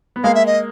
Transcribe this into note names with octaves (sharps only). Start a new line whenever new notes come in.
B3
G#3 A#3 F5
E5
D#5